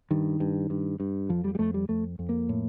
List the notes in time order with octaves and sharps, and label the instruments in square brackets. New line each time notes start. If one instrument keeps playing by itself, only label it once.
[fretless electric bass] G2 D#3
G2
G2
G2
F2 F3
G3
G3
F2 A3
G3
F2 A3
F2
A#3
A2